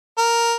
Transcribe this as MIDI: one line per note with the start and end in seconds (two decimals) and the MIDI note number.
0.18 0.55 70